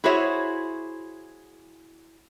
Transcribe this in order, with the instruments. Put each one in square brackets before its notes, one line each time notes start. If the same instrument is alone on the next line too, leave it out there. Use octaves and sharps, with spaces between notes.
[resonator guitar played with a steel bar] E4 F#4 G#4 C5 C#5 E5